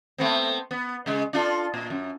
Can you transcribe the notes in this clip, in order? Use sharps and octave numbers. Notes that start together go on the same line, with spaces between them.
A3 B3 C4
B3
C#3 G#3
D4 F4 A4
A#2
F#2